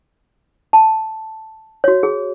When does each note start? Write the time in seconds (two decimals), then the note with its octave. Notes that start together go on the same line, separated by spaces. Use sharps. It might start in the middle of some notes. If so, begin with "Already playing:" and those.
0.73 A5
1.84 F#4 C#5
2.03 G#4